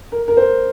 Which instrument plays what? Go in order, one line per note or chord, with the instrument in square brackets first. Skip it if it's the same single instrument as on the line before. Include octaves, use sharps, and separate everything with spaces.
[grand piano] A#4
A#4
C5